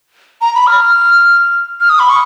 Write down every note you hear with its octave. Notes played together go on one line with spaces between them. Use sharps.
A#5
B5
F6
F6
D#6
B5
C#6